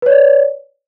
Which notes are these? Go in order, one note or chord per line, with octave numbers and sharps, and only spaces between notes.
B4 C#5 D5